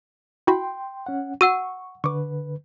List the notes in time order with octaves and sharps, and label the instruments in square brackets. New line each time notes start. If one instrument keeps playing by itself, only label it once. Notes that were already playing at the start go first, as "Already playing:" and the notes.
[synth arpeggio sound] E4 F#4 B5 [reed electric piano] G5 C6
[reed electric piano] C#4 F#5
[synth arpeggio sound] F#4 [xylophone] F#5 E6 D#7 [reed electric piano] C#6
[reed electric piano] D3 B4 [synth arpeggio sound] C#6 D6